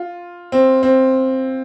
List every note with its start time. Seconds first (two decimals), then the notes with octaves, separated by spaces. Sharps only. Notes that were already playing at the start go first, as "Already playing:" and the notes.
Already playing: F4
0.52 C4
0.83 C4